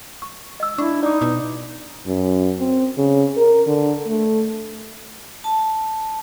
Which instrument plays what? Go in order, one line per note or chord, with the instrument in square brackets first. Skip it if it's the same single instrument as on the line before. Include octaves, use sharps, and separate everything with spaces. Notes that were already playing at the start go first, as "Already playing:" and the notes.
[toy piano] C#6
D#5 E6
[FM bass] D4 [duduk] E4 [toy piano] C#6
[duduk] D#4 [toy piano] D5 D6
[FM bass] B2 [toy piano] D6
[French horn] F#2
C4
C#3
A#4
D3
A3
[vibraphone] A5